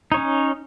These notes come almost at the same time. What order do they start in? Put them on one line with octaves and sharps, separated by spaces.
D#4 C#5 C#4